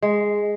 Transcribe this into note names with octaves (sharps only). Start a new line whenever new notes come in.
G#3